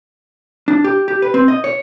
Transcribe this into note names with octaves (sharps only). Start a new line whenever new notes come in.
D4
G4
G4
B4
C4
D#5
C#5